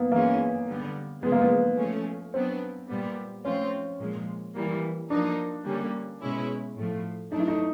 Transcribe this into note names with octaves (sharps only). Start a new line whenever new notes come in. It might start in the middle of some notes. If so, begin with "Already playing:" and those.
Already playing: A#3 B3
E3 G#3 A#3 C#4
D3 G3 B3
C#3 F3 G#3 B3
A#3
B3
F3 A3 C#4
F#3 B3 C4 D4
A#2 G3 B3
F3 A3 C4 C#4 F4
A#2 F3 G#3
E3 G3 A#3
F3 A#3 D4 D#4
D3 G3 A#3 C#4
B2 G#3 C#4 E4
A2 F3 A3
F#3 A3 D4 D#4
E4
D#4